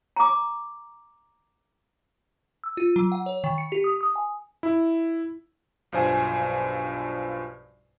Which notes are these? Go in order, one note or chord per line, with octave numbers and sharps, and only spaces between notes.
A#5 D6
E6
F4
F#3
F#5
C#5
D#3
C#7
G4
D#6
D#6
G#5
E4
B1 G2 F3 C5 G#5